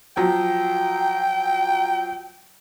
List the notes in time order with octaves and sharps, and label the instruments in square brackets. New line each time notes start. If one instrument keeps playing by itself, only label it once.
[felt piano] F3 F#3 [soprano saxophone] G5